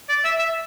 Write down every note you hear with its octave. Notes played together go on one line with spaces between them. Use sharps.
D5
E5
E5